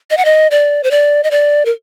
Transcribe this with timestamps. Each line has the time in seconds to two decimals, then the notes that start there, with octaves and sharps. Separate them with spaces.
0.10 D#5
0.17 F#5
0.25 D#5
0.51 D5
0.83 C5
0.91 D5
1.24 D#5
1.31 D5
1.65 A#4